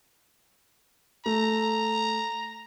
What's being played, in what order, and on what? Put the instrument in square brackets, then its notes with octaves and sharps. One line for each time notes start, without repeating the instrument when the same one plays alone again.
[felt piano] A3 [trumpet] A#5